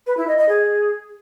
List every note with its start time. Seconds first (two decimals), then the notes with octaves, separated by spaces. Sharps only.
0.07 B4
0.17 E4
0.28 D#5
0.38 D#5
0.49 G#4